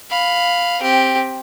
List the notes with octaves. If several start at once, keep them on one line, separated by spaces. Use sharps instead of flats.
F5 B5
C4 G4